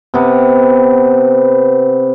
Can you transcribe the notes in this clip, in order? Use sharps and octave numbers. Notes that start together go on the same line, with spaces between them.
C3 B3